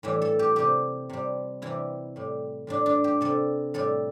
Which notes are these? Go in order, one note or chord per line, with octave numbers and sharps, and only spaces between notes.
A2 E3 G3 E4
A4
G4
C3 G3 G4
C3 G3
C3 E3 G3 E4
A2 G3
A2 G3 D4
D4
G4
C3 G3 A4
A2 G3 A4